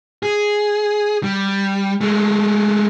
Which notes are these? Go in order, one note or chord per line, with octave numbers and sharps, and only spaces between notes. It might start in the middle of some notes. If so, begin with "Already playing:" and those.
G#4
G3
G#3 A3